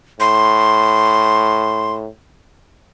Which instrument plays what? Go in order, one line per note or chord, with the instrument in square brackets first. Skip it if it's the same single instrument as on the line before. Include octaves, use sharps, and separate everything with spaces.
[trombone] A2 [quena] C6